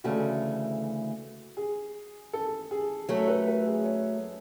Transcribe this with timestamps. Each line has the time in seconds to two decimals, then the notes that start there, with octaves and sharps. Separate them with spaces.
0.04 D2 C#3 E3 A3 F#4
1.57 G#4
2.33 A4
2.71 G#4
3.09 F#3 A3 C#4 A4
3.28 B4
3.47 B4
3.67 G#4
3.85 C#5